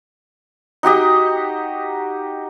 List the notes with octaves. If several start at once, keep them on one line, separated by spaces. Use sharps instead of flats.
D#4 F#4 G4 D#5